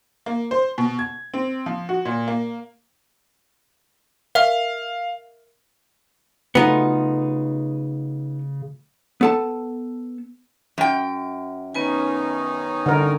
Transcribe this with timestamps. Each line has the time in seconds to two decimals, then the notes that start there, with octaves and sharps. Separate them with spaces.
0.26 A#3
0.51 C5
0.78 B2
0.99 G#6
1.34 C4
1.66 F3
1.89 F#4
2.05 A#2
2.28 A#3
4.35 A#4 E5 F5 F6
6.55 C#3 F#3 A3 B3 D#4 F4
9.21 B3 A4 A5
10.78 F#2 G5
11.75 D#3 B3 C#4 D#4 B4 G#5
12.86 D3 A#4